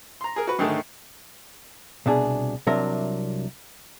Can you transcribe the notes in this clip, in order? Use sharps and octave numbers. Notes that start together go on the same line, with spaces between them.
A#5 C6
G#4 A#4
F#4 B4
G#2 D3 D#3 G#3 A3
C2 B2 D4 G#4
C2 C3 F#3 D4 A#4